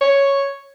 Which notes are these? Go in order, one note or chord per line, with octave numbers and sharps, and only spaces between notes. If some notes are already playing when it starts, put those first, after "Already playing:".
C#5